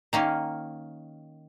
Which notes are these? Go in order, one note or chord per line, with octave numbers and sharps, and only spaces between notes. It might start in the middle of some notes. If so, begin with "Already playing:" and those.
D#3 A#3 C#4